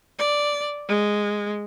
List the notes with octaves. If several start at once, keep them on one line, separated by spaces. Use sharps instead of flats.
D5
G#3